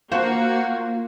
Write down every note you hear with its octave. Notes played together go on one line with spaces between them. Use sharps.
A#3 F4 F#4 C5